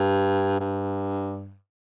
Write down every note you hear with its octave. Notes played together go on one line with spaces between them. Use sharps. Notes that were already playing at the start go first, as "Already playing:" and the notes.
Already playing: G2
G2